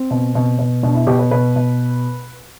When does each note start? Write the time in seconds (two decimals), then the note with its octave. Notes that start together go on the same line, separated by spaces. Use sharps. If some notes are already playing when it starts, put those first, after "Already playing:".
Already playing: C4
0.11 B2
0.35 B2
0.59 B2
0.83 B2 D4
0.95 E4
1.07 B2 G4
1.19 B4
1.31 B2 B4
1.56 B2